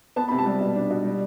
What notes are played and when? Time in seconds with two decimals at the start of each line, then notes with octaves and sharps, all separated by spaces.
0.16 B3 A5
0.28 C3 B5
0.38 A5
0.46 G3
0.61 B2
0.75 D4
0.90 B2
1.05 G3